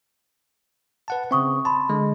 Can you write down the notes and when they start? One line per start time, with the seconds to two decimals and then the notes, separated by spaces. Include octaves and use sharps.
1.08 B4 F#5 A5
1.31 C#3 C4 E5 C#6 D#6
1.65 A5 B5 C6
1.89 D3 G#3